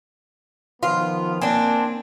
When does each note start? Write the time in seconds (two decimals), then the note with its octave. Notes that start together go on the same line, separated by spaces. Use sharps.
0.83 D#3 F3 B3 F4
1.41 A#3 C4 D4 G#5